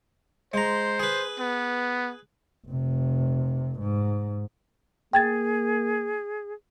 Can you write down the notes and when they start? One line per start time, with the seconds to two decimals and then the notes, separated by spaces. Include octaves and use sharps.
0.54 G#3 C5 A#5
0.99 G#4 B4
1.39 B3
2.67 F1 C3
3.80 G#2
5.13 A#3 G#4 G5 G#6 A6